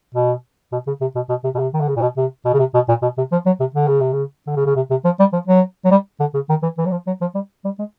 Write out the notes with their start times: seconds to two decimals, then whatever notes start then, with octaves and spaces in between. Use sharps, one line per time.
0.14 B2
0.72 B2
0.87 C#3
1.01 C3
1.15 B2
1.29 B2
1.44 C3
1.55 B2
1.59 C3
1.73 D#3
1.81 D3
1.88 C#3
1.96 A#2
2.01 B2
2.17 C3
2.45 B2
2.54 C#3
2.59 C3
2.74 B2
2.88 A#2
3.02 B2
3.17 C3
3.32 F3
3.46 F#3
3.60 C3
3.74 D3
3.88 C#3
4.00 C3
4.13 C#3
4.47 D3
4.56 C#3
4.66 C#3
4.76 C3
4.90 C3
5.05 F3
5.20 G3
5.33 F3
5.47 F#3
5.85 F#3
5.91 G3
6.20 D3
6.34 C#3
6.49 D#3
6.62 E3
6.78 E3
6.85 F#3
6.91 F3
7.07 F#3
7.21 F3
7.35 G3
7.65 G3
7.79 G#3